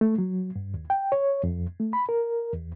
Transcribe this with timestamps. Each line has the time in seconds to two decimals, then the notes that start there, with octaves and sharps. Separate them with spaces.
0.01 A3
0.18 F#3
0.56 G2
0.74 D#2
0.90 G5
1.12 C#5
1.43 F2
1.80 A3
1.93 B5
2.09 A#4
2.53 E2